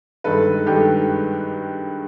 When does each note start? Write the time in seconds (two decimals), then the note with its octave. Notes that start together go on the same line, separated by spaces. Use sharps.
0.24 G2 D#3 G#3 A4 B4
0.66 G2 D#3 G#3 G4 A4